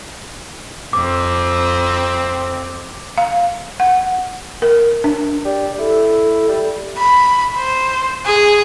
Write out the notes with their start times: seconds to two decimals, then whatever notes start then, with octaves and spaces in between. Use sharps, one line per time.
0.93 F2 C4 D6
3.17 F5
3.80 F#5
4.62 A#4
5.04 D4
5.45 G4 D5
5.79 E4 A4
6.49 G3
6.98 B5
7.57 C5
8.26 G#4